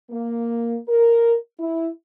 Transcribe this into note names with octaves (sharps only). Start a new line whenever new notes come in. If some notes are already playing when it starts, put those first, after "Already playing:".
A#3
A#4
E4